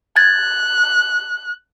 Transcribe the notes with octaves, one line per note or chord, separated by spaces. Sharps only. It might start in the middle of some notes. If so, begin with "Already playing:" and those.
F#6 G#6 A6